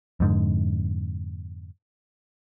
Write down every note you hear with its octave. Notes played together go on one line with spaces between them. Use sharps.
F2 G#2 D3